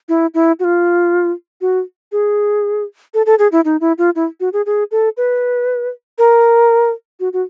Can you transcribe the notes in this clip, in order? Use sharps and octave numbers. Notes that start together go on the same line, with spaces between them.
E4
E4
F#4
F4
F#4
G#4
A4
A4
G#4
E4
D#4
E4
F4
E4
F#4
G#4
G#4
A4
B4
A#4
F#4
F#4